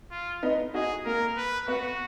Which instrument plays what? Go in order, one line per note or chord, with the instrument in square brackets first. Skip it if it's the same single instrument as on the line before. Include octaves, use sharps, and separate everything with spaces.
[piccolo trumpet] F4
[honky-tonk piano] B3 D#4
[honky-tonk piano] D#4 F#4 [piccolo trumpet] G#4
[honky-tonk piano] A#3 [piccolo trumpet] A#4
[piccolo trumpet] B4
[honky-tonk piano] B3 [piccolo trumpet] F#4